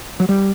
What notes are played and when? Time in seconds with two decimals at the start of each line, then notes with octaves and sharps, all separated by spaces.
0.20 F#3
0.29 G3